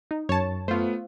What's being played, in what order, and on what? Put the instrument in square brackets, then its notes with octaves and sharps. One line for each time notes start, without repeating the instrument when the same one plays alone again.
[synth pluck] D#4
[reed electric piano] F#2 [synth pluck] C#5 A5
[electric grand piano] A3 B3 [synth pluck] F4 C5